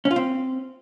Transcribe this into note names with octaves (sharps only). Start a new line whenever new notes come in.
C#4
F4
C4